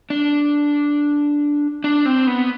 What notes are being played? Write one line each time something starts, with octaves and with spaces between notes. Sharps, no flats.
D4
D4
C4
B3